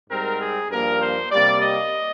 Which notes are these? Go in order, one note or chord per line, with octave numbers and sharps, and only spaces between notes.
G#2 G3 C4 A#4
G#4
G2 F3 A#3 A#4
C5
C3 G3 A#3 D5
D#5